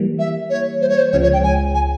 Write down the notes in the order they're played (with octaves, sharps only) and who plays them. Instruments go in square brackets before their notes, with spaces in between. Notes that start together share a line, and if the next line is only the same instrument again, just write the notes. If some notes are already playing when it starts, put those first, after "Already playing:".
Already playing: [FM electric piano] E3 G3 A#3
[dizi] E5
C#5
C5
C#5
C5
[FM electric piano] C#2 C#3 F3 G#3 [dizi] C#5
[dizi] C#5
G5
G#5
G#5